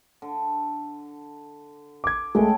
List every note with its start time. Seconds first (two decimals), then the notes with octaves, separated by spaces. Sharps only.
0.22 D3
2.04 D6 G#6
2.35 C#3 G#3 A3 A4 G5